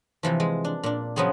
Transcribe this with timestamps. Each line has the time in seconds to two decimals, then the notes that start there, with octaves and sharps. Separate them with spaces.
0.23 C3 E3 F3
0.40 G#3
0.65 D4
0.83 A#2 D4
1.16 C#3 F3 F#3 B3 C4 G#4